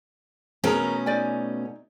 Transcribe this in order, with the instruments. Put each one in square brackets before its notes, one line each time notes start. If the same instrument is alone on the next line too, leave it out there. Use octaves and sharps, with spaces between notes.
[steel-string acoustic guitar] B2 A3 C#4 [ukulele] G#4 A#4 A#5
[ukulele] D#4 D5 G#5